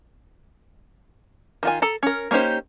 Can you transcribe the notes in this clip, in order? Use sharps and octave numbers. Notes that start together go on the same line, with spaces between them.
D#3 F4 G#5
A4 A#5
C#4 A#4
A#3 C#4 D#4 G4 C5